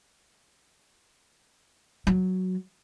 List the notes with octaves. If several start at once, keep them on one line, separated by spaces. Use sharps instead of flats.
F#3